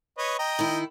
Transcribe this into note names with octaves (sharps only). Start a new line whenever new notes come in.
B4 C#5 D#5
D#5 G5 A#5
D#3 E4